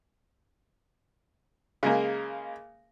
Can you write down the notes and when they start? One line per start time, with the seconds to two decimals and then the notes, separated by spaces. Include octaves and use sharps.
1.83 C#3 G#3 A#3